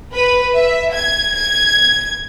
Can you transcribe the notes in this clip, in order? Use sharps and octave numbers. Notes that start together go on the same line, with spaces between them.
B4
E5
G#6
G#6